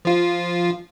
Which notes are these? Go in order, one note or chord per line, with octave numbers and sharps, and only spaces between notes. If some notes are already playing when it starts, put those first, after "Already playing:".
F3 F4